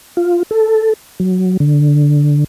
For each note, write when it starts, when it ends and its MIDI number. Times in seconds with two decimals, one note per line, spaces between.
0.17 0.43 65
0.51 0.93 69
1.20 1.57 54
1.60 2.44 50